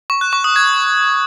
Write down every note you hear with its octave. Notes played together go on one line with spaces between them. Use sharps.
C#6
F#6
C#6
D#6
G#6